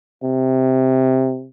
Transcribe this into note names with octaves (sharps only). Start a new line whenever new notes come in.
C3